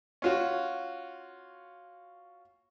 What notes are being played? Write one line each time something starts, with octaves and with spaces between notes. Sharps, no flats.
C#4 F4 F#4